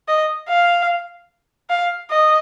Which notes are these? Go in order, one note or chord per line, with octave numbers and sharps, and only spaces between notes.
D#5
F5
F5
D#5